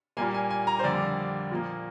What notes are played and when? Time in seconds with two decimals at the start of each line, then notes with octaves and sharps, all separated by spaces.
0.17 A#2 G3 A#3 G#5
0.34 G#5
0.50 G#5
0.67 A#5
0.79 C5
0.84 F2 D3 G3 A#3 D5
1.51 A#2 F3 A#3